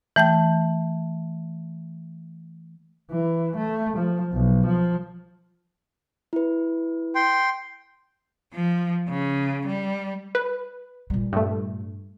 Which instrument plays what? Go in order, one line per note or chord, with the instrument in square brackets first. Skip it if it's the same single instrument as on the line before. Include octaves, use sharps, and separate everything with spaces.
[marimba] E3 A3 G5 G6
[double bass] E3
A3
F3
B1
F3
[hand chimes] E4 B4
[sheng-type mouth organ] G5 C6
[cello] F3
C#3
G3
[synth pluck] B4
[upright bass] A#2 G3
[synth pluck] G2 A3